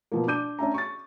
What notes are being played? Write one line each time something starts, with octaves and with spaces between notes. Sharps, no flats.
B2 F3 A#3
D4 D6 G6 D#7
C#4 D4 E5 A#5
C#6 A6